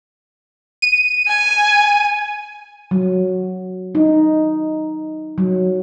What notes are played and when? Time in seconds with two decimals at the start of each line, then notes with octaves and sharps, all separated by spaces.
0.82 D#7
1.27 G#5
2.91 F#3
3.95 D#4
5.38 F#3